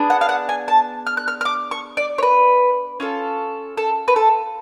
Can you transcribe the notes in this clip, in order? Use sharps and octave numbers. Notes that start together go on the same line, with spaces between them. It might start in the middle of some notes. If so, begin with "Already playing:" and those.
Already playing: B3 D4 G#4
F#5
F5
F#5
G#5
A5
F6
F#6
F6
F6
D6
C#6
D5
C#5
B4
C#4 F4 A4
A4
B4
A4